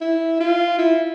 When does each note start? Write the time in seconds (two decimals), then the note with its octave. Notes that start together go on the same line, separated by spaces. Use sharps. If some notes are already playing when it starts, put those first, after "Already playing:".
0.01 E4
0.40 F4
0.78 E4